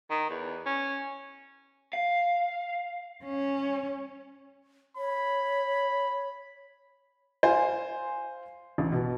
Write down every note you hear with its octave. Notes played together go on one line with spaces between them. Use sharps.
D#3
E2
C#4
F5
C#4
C#5 B5
C5 F5 G#5 C6
A1
B2